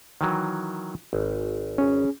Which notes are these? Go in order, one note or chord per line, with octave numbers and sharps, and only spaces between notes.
D#3 E3 F#3
G#1
C#4 G#4